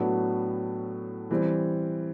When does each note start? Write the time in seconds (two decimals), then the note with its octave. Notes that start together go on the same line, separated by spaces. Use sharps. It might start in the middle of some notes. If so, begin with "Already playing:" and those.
Already playing: A2 F#3 B3 D4
1.31 E3 G3 C4